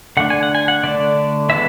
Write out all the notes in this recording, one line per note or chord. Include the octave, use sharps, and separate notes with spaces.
D3 A3 D4 F#5
G#5
F#5
G#5
F#5
D3 A3 D4 D5
E3 G#3 B3 E5